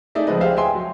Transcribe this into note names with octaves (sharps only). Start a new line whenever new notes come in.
A3 D#4 G#4 D5 E5
C#2 F3 G#3 B4 D#5
G#3 G4 G#4 C5 E5 F5
E5 G5 G#5 C6
F#3